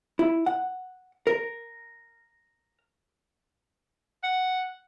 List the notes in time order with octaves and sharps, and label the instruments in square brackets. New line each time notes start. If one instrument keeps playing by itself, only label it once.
[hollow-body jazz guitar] E4
F#5
A#4
[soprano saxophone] F#5